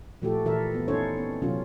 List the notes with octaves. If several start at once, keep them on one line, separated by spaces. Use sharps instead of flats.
A#2 F3 A3 F#4 G4 A4
A#2 E3 E4 A4 A#4 E5
B3
C#4 D#4 E4 A4 C5 C#5
B3 C4
C3 F#3 C#4 F4